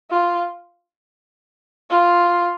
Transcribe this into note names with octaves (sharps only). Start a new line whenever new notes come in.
F4
F4